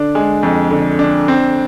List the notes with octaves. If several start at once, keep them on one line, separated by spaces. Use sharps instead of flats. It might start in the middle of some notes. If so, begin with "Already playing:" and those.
Already playing: D3 D4
G#3
F2
D3
D4
C4